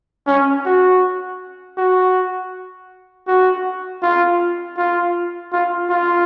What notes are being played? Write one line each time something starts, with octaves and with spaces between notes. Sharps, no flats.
C#4
F#4
F#4
F#4
F4
F4
F4
F4